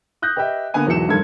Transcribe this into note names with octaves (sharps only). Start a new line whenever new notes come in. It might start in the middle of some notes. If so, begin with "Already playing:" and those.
D#6 F#6 G6 A#6
G4 B4 D#5 E5 G5
D3 A#3 B3 G#5 D#7
E1 G#2 E3 F#3 C#7 E7
F1 G2 D#3 A4 G#6